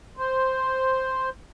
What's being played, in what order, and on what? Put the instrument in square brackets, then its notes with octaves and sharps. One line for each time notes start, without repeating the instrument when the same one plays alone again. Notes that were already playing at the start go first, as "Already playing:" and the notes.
[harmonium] C5